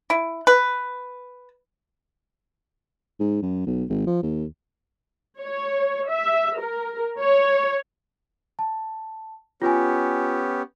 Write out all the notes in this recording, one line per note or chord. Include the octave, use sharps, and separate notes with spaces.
E4
B4
G#2
F#2
B1
G#1
F3
D#2
C#5
E5
A#4
C#5
A5
B3 C#4 F4 G4 G#5